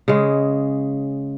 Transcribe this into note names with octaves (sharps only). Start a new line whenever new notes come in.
C#3 G#3